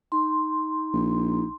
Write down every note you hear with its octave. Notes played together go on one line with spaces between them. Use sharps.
D#4 C6
A#1